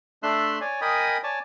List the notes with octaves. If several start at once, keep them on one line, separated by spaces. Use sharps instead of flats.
A3 D4 E5 C6 E6 F#6
C#5 D5 G#5
A#4 D#5 G5 G#5 B5 D#6
C#5 D5 G#5 A5